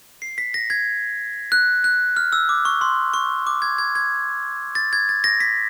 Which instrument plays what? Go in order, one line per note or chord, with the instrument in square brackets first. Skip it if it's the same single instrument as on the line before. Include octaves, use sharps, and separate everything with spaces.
[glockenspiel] C7
B6
A#6
G#6
F#6
F#6
F6
E6
D6
C#6
C6
C#6
D6
G#6
G#6
G#6
A6
G#6
A6
A#6
B6